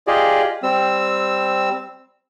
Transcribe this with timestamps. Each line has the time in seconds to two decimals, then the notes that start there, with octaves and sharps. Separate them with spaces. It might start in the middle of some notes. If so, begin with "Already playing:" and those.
0.07 F4 G4 G#4 D5 D#5
0.63 G3 C4 E6